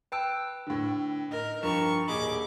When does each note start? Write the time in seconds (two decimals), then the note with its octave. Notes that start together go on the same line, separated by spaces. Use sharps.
0.12 B4 G5 A5 E6
0.67 A2 D3
1.31 D#4 A#4
1.63 G2 F3 A#4 A#5 C#6
2.08 D#1 G#4 D#5 B5 D6